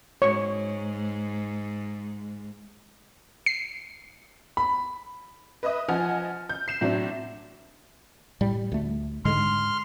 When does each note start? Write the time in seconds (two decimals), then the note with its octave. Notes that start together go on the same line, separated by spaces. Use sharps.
0.22 G#2 C#5 C#6
3.46 C7
4.57 B5
5.63 B4 D#5 E5 D#6
5.89 F3 D#5 F#5 G#5 F6
6.49 G6
6.68 C7 E7
6.81 A2 F#3 C4 D4
8.41 A2 G3
8.72 D2 A3
9.25 G#2 D3 G#3 C6 F6